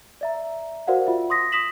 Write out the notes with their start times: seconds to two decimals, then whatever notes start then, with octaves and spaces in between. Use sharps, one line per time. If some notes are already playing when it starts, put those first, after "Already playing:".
0.21 D5 E5 A#5
0.87 F#4 A#4 C5 D5 F5 F#5
1.07 F4 E5
1.30 C6 D#6 A#6 B6
1.52 D#6 A#6 B6 E7 F#7